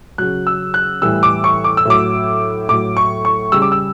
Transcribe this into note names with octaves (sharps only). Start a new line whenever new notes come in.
C#3 F#3 F#6
E6
F#6
A2 E3 G3 E6
D6
C#6
D6
E6
A2 F#3 D6
A2 F#3 D6
C#6
C#6
C#3 G3 E6
D6
E6